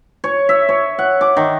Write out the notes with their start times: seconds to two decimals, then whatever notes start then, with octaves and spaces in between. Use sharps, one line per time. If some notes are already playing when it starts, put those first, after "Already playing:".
0.24 C#5
0.49 E5
0.69 C#5
0.98 F#5
1.21 D6
1.37 D#3